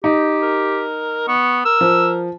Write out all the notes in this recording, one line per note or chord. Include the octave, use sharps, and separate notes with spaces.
D#4 G4
A#4
B3 C#6
A#4 E6
F3